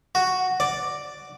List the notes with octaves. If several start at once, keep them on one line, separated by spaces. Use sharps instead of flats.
F#4
D5